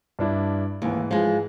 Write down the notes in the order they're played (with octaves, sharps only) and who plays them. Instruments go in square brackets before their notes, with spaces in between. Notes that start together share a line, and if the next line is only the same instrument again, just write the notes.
[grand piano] G2 D4 E4
[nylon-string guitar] D#2 [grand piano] G#2 E3
[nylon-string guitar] F3 G#3